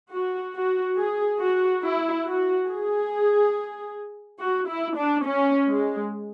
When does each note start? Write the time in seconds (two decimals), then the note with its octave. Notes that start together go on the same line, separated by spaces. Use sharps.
0.11 F#4
0.54 F#4
0.97 G#4
1.39 F#4
1.83 E4
2.25 F#4
2.68 G#4
4.39 F#4
4.68 E4
4.96 D4
5.25 C#4
5.68 G#3